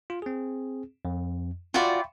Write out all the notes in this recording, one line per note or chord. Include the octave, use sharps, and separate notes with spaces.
F4
C4 G#4
F2
F4 F#4 D5 E5 G5 B5